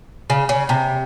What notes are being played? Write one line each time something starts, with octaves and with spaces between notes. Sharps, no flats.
C#3
C#3
C3